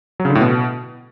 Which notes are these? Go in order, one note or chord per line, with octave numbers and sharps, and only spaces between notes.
F#3
C#3
D3
A2
B2